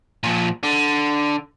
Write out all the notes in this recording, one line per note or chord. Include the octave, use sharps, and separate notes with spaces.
A#2 F3
D3